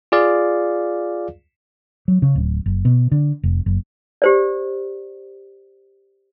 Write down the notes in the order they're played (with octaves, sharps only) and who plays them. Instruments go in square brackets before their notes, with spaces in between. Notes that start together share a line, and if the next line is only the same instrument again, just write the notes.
[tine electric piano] F4 G#4 D5 F5
[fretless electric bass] F#3
C#3
D1
F#1
B2
D3
F1
F#1
[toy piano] G4 C5 D5